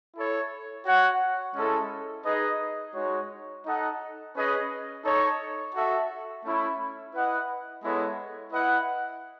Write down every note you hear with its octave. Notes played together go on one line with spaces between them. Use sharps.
E4 A4 C#5
F#4 C#5 F#5
G#3 C#4 E4 A4
D#4 G#4 B4 D#5
G#3 D#4 F#4 C#5
D#4 A4 D#5 F#5
C#4 G#4 B4 D#5
D#4 A4 C#5
F#4 A4 E5
A3 C#4 E4
E4 B4 D#5 F#5
G#3 B3 E4 A4 C#5
E4 B4 D#5 F#5